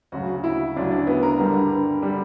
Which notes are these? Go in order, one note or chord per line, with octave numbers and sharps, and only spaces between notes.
D2 C#3 F#3 F#4
E4
D2 C#3 F#3 D4
D4
B3
A#4
G2 D3 G3
D3 G3